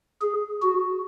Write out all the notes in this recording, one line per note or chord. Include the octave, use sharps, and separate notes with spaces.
G#4
F#4